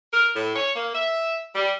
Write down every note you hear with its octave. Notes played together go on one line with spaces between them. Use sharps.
A#4
A2
C#5
A#3
E5
G3